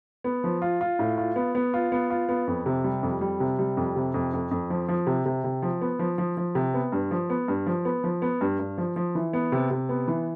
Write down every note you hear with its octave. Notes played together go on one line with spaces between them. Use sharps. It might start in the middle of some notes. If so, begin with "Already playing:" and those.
B3
F3
F4
F4
A2
F4
B3
B3
F4
B3
F4
B3
F2
C3
G3
F2
G3
C3
G3
F2
C3
F2
F2
F2
F3
F3
C3
C3
C3
F3
B3
F3
F3
F3
C3
B3
G2
F3
B3
G2
F3
B3
F3
B3
G2
G2
F3
F3
E3
B3
C3
C3
B3
E3